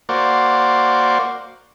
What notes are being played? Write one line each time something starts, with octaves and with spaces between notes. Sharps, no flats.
A#3 F#4 C5 D5